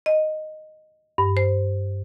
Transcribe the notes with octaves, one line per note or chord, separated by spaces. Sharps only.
D#5
G2
C5